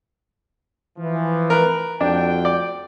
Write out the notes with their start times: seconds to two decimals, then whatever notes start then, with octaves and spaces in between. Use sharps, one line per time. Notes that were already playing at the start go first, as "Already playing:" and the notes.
0.99 E3 F3
1.50 A#4 B4
2.01 F2 D4 F#4 G5
2.45 D5